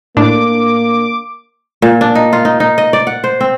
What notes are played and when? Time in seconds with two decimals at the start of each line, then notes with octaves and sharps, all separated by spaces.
0.17 A2 A#3 D4 D6
1.82 A#2
2.01 D4
2.15 D#4
2.33 F4
2.45 D#4
2.60 D#4
2.78 D#5
2.93 D5
3.07 F#5
3.24 C5
3.41 C4